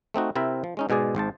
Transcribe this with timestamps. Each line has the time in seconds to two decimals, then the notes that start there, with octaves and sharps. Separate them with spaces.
0.14 A3 C4 D#4 F#4
0.35 C3 C4 E4 A#4 E5
0.64 F3
0.77 G#3 C#4 D#4
0.89 G#2 B2 G#3 G#4 D5
1.15 G#1 G#2 C5 A5